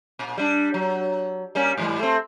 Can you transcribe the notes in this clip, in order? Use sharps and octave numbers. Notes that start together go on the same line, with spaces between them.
A#2
G3 D4
F#3
G3 A#3 C#4
G#2 E3 G3
A3 C4